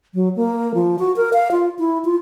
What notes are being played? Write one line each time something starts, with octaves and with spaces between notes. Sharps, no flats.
F#3
A#3
F3
F#4
A#4
F5
F4
E4
F4